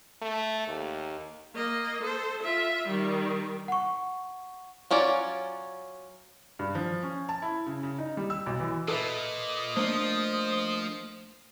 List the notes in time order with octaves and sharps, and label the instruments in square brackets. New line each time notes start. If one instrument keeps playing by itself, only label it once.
[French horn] A3
D#2
[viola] A#3 D#5
A4 C5
F4 E5
D#3 G3
[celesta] F#5 C#6
[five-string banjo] F#3 C#4 F4 D5
[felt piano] G2
F3
C#4
A5
E4
C#3
C#3
D#4
G3
E6
B1
E3
[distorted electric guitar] A#2 [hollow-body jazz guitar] A4 B4 E5 [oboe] D#5
[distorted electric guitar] F3 [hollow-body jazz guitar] A3 A#3 D4 [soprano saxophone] C5